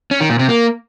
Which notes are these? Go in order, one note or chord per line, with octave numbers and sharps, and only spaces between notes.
C#4
D#3
A#2
C3
A#3